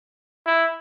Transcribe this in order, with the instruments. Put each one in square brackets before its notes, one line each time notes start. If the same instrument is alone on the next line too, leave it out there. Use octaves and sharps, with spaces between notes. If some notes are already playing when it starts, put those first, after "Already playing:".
[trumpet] E4